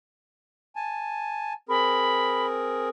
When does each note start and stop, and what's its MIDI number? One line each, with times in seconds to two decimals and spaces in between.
0.76 1.53 80
0.76 1.53 81
1.69 2.89 60
1.69 2.89 68
1.69 2.89 70
1.69 2.47 83